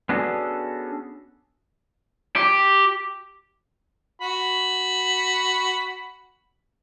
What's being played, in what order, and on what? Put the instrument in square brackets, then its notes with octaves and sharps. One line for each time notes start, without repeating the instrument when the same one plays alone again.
[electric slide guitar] B3 C#4 D4 F#4 G#4 A4
[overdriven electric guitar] G4
[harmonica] F#4 B5